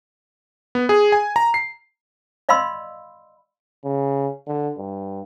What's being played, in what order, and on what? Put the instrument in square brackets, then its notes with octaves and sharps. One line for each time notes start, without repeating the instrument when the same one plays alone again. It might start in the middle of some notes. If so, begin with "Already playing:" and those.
[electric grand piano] B3
G#4
G#5
A#5
C7
[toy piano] D5 D#5 F5 B5 C6 E6
[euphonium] C#3
D3
G2